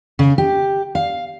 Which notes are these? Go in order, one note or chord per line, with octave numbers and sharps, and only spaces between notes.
C#3
G4
F5